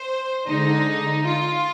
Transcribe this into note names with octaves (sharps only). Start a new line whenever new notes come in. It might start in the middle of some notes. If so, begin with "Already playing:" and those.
Already playing: C5
D3 G#3 D#4
F4